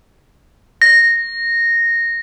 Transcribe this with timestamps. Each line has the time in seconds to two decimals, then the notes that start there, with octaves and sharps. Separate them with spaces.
0.82 A#6